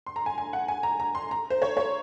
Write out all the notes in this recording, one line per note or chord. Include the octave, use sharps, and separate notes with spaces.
C6
A#5
G#5
G#5
F#5
G#5
A#5
A#5
C6
A#5
C5
C#5
C#5